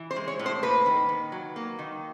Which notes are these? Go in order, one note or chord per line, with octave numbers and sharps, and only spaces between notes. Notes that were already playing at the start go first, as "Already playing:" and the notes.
Already playing: E3
C5
G#3
C#5
A2
C5
A#3 B4
D#3
D#3
F#3
A#3
D#3